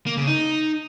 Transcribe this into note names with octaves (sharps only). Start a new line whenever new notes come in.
A#3
C#3
D#4